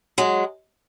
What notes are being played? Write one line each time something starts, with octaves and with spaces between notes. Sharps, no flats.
F#3 G#3